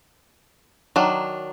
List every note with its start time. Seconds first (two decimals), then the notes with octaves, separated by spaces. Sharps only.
0.96 D#3 F#3 D4